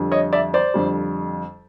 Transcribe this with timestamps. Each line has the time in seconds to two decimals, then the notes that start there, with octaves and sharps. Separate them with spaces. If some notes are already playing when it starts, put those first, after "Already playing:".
Already playing: F2 D3 G3
0.12 C#5 D#5
0.33 D5 E5
0.54 C5 D5
0.74 F2 D3 G3